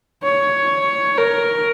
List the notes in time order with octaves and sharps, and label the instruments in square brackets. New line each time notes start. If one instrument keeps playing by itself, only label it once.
[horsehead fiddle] C#5
A#4